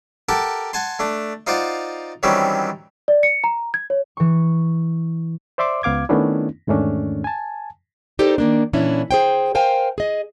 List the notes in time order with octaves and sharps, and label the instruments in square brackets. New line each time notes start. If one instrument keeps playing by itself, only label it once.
[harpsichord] G4 A4 A#4 F#5 A5
F#5 G#5 A5 C6
A3 D4
D#4 F4 C5 D5 F#5
D#3 E3 F#3 G3 C4 C#4
[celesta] D5
C#7
A#5
G#6
C#5
[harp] E3 C#6
[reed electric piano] C5 D5 E5 C6 D6
C#2 B3 F5 D6 G#6
D#3 A3 B3 C#4 D4 E4
E2 G#2 D#3 A3 C#4 D4
G#5 A5
[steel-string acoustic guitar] D#4 G4 A4 A#4 C5 D5
D#3 A#3 D4
A#2 E3 C#4 D4 E4
G#4 C5 G5
A#4 C5 F5 G5 G#5
G#4 D#5